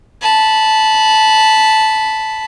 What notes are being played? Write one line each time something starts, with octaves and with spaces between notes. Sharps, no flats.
A5 B5